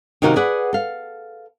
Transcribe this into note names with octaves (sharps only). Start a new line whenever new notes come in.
C3 D#3 D#4 F#4 G4 F5
G#4 B4 D5 F#5
A4 F5